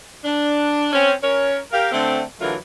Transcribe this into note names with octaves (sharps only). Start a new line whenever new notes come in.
D4
C4 C#4
C#4 A#4 C#5
G4 A#4 F5
D3 A3 C4
D3 E3 F#3 A3 F4 A#4